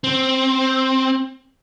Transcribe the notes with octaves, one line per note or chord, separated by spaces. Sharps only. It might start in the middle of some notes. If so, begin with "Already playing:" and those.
C4